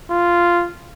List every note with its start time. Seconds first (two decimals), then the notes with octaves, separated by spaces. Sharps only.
0.10 F4